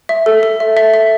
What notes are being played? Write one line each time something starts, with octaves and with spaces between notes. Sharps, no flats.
E5
A4
A4
E5
E5
E5